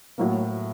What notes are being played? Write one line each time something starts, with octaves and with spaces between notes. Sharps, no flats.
A2 F#3 A#3